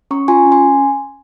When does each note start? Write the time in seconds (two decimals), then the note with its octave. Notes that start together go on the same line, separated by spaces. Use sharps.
0.11 C#4 A#5 C#6
0.28 F4 G#5 C6
0.46 C#4
0.52 G#5 C6